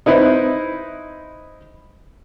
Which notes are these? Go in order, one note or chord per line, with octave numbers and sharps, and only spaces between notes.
D#4 E4 B4 C5